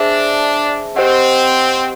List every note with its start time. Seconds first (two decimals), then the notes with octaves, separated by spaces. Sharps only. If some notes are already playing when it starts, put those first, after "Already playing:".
Already playing: D4 G#4 C5 E5 A5
0.96 C4 G4 C5 D#5 F#5